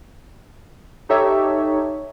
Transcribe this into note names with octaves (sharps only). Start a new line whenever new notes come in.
D#4 G4 A4 C#5 E5